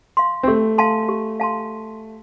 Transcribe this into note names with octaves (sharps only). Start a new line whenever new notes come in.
F5 C6
C4
A3 G4
F5 A5 C6
G4
F5 A5 C6